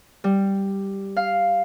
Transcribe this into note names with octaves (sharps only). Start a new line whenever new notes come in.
G3
F5